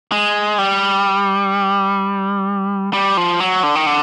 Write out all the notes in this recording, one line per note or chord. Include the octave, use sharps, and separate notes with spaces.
G#3
G3
G3
F3
F#3
D3
D#3
D3